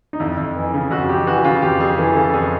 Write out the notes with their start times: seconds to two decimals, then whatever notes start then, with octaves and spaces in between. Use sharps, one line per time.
0.13 D#4
0.20 F2 E4
0.38 F2
0.56 E3
0.74 C#3
0.91 F2 F#4
1.09 F2 G4
1.27 E3 F#4
1.44 C#3 F4
1.62 F2 G4
1.80 F2 G#4
1.97 E3 A4
2.16 C#3 A4
2.34 F2 G#4